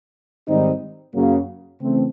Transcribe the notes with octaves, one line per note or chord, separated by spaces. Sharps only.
G#2 D#3 G3 C4 D#4
F#2 C#3 F#3 A#3
C#3 E3 A3 C4